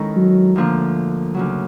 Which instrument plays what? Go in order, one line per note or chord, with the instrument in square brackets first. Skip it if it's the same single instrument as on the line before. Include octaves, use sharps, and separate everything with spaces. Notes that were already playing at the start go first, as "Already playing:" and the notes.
Already playing: [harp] D#3 G#3 C#4 E4 A4
[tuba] F#3
[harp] D2 D3 F3 A#3
D2 C#3 F#3